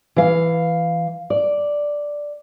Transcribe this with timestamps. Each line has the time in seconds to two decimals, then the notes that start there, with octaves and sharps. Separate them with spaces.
0.16 E3 F5
1.30 D5